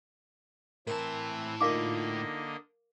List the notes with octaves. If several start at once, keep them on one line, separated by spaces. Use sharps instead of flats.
A2 E3 C4 A#4 A5
D3 A#3 D#4 F4 A#4 D#5 F5 D6